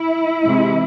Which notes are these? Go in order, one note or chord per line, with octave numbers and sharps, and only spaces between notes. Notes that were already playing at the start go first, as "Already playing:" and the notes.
Already playing: E4
C3 E3 G#3